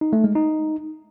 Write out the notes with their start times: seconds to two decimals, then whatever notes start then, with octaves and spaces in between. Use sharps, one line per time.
0.01 D#4
0.13 A3
0.24 G#3
0.35 D#4